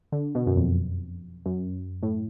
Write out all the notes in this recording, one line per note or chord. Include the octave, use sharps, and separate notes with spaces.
D3
B2
F#2
F2
F#2
A2